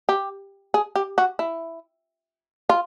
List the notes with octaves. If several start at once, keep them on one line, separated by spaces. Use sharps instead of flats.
G4
G#4
G4
F#4
E4
F4